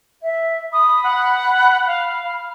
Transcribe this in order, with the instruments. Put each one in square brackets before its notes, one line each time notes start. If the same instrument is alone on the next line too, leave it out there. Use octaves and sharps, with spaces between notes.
[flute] E5
[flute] B5 [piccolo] D#6
[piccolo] F#5
F5
F6